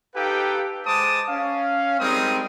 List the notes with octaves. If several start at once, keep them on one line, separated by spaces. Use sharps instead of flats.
D#4 G4 A4 B4 F5 G5
G#3 C5 A5 D6 D#6
C#4 F5
G3 G#3 C4 D#4 A#4 D#6